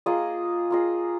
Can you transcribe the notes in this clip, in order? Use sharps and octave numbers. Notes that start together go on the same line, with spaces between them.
A#3 F4 G#4 D#5
A#3 F4 G#4 D#5